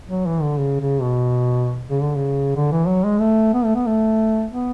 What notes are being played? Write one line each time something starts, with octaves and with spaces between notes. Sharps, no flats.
F#3
E3
D3
C#3
C#3
B2
C#3
D3
C#3
D3
E3
F#3
G#3
A3
B3
A3
B3
A3
B3